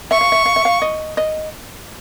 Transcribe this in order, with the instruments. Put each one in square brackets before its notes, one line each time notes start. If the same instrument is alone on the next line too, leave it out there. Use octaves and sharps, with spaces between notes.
[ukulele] E5 [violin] C#6
[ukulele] F5
E5
F5
E5
F5
D#5
D#5